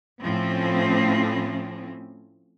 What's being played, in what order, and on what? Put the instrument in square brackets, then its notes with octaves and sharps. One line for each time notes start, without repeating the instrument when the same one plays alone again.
[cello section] A2 F3 C4 C#4